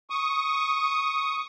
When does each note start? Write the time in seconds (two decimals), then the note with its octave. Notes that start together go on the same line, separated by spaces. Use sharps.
0.10 C#6 D#6